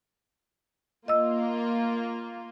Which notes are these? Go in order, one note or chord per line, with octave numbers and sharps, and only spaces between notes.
A#3 F4 D#5 E6